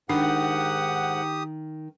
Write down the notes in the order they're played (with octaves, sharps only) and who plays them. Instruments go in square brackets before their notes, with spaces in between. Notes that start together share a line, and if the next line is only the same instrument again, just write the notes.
[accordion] G#2 F#5 [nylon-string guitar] D#3 [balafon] D4 [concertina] G4 D#6